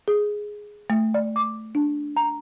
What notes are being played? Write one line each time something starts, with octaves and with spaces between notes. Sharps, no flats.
G#4
A3
D5
D6
D4
A#5